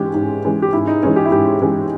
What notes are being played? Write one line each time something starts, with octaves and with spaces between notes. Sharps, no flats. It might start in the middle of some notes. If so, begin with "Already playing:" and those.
Already playing: G#2 E3 G#3 C#4 G4
G#2
E3 G#3 C#4
G4
G#2 E4
D#4
E3 G#3 C#4
G4
E4
G#2 G4
E3 G#3 C#4